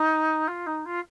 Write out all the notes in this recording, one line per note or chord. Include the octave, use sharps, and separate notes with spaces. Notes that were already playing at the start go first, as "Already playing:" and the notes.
Already playing: D#4
F4
D#4
F4